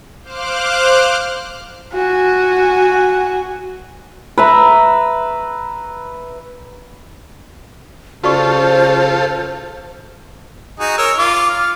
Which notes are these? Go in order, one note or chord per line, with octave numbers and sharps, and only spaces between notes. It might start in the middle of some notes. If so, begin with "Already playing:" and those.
C5 F5 D6 F6 F#6
F#4 G#5
B4 E5 A#5
C#3 F4 F#4 A4 C5 D5 C#6
D#4 F#4 G#4
A#4 C#5 E6
F4 D6
F6